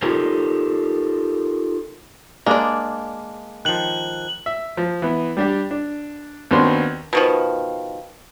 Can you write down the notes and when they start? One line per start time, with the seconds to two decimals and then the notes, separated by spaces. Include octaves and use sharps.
0.02 D#4 F4 G4 A4 A#4 C5
2.46 G#3 A#3 D4 D5
3.65 D#3 F3 F#6 F#7
4.46 E5
4.77 F3
5.02 E3 B3
5.37 G3 D4 G4
5.71 D4
6.51 D#2 B3 C4 D4 F#4 C6
7.13 B2 D#3 F3